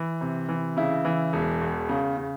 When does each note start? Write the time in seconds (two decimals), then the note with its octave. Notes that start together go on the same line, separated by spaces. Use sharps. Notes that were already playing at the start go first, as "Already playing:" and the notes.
Already playing: E3
0.21 C3
0.49 E3
0.77 C#3 E4
1.05 E3
1.33 E1
1.61 E2
1.89 C#3
2.17 C#3